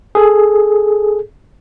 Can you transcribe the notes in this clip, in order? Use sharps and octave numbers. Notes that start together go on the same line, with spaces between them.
G#4 A4